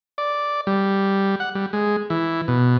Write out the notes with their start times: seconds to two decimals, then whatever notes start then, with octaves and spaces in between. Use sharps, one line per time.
0.18 D5
0.67 G3
1.40 F#5
1.55 G3
1.73 G#3
2.10 E3
2.48 B2